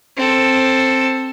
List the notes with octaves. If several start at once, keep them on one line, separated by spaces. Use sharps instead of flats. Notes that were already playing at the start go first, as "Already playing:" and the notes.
C4 A4